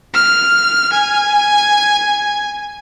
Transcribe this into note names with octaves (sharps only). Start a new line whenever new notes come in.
F6
G#5